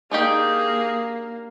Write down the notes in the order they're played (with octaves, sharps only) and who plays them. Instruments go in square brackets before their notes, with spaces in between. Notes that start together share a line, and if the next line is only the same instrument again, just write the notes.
[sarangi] A#3 [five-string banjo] D4 D#4 G4 [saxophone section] G#4